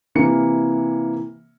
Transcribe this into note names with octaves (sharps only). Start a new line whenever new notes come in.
C3 E3 A#3 C#7